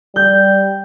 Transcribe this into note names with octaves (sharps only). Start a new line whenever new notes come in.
G3 G6